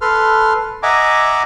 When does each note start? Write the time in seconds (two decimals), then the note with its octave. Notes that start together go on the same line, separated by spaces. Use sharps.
0.01 A4 B4 C6 F6
0.83 D#5 E5 F#5 G#5 A#5 D6